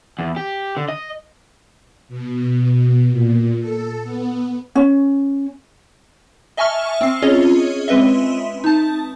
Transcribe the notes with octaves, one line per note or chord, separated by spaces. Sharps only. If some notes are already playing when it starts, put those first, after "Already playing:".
E2
G4
D3
D#5
B2
A#2
A4
B3
C#4
D#5 E5 G#5 A5 C#6 F6
C4 C7
C#4 F4 G#4 C#5 D#5
G#3 C4 B4 D#5 E5
D#4 A5